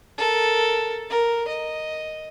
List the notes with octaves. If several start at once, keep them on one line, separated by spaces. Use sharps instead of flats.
A4 A#4
A#4
D#5